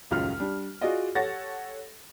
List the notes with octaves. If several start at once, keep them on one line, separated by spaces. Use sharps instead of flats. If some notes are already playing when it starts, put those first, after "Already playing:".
D#1 C#2 F#2 F4 F6
G3 D4
F4 F#4 G#4 D5 D#5
G4 A4 C#5 F#5 A6 A#6